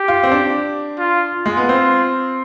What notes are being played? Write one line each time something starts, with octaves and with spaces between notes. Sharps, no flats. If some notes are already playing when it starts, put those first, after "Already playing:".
Already playing: G4
F4
C4
D4
F4
F4
G#3
B3
C4